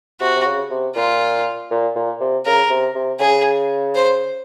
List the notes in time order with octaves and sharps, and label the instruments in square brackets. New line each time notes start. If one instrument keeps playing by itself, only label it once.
[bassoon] C3 [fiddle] F#4
[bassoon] C3
C#3
C3
[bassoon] A#2 [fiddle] F4
[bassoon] A#2
A#2
C3
[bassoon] C#3 [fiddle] A#4
[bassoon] C3
C3
[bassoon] C#3 [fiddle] G#4
[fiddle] C5